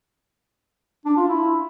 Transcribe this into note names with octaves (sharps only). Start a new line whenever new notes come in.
D4
F4
E4